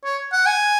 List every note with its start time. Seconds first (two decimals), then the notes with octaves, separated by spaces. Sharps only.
0.04 C#5
0.33 F#5
0.47 G#5